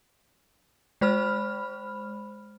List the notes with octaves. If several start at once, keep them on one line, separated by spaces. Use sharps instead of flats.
G#3 C5 B5 F6